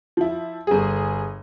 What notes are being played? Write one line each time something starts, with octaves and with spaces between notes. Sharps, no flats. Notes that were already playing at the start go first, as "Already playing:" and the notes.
F3 E4
G1 G#4